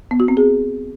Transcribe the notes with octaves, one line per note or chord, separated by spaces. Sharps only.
B3
F#4
C4
G#4